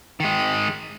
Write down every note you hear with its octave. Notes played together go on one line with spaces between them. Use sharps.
D#3 G#3